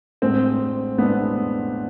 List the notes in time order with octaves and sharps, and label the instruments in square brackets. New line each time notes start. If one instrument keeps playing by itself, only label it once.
[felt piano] A1 A2 G#3 D4 [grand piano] C4
[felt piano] A1 A2 G#3 D4 [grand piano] B3